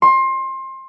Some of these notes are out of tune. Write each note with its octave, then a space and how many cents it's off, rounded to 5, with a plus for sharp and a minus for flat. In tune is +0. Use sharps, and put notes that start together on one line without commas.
C6 +25